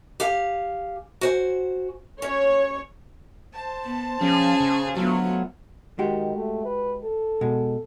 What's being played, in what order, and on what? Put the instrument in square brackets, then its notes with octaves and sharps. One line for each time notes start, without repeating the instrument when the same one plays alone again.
[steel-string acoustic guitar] G4 F5 G#5
F#4 C5 G#5
[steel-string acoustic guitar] C#4 [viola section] C#5
[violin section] C5 A5
[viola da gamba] B3
[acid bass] F3 [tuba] C#4 [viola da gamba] G#4
[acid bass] C#3
[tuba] D2 [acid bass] F#3 [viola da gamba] A3 B3 F4
[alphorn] D#3 [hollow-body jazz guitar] G#3 F#4 G4
[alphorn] A3
B4
A4
[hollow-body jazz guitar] B2 G#3